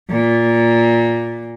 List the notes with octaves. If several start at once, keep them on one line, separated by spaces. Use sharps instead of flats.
A#2